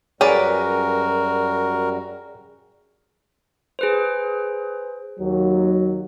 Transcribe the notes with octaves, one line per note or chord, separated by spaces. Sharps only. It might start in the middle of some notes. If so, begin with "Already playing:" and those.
F#2 G3 C#4 F#4 G#4 A#4 B4 D5
G#4 B4 C5
D#2 F#3